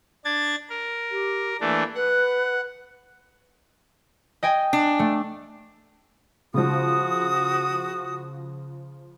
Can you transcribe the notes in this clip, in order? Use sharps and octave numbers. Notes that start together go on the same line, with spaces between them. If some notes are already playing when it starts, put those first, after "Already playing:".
D4 G#6 A6
A#4
G4
E3 A3 A#3 D4
B4 F#5
D#5 G5 G#5
D4
A3
C#3 F3 F#4 D#6